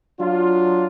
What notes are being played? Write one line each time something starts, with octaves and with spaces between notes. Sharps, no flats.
F#3 D4 F4